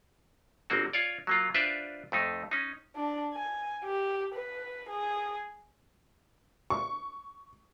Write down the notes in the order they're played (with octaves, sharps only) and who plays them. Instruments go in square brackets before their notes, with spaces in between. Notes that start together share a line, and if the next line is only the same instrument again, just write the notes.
[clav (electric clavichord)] G1 A#3 C4 F#4
F4 C#5 D5
F#3 A#3 F4
D4 F4 B4 C5 D5 E5
F2 A3 D#4
C#4 D#4
[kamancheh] D4
G#5
G4
B4
G#4
[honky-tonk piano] C#6